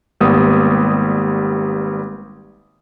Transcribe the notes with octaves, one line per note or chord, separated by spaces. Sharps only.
G#1 G3 A#3 B3 D#6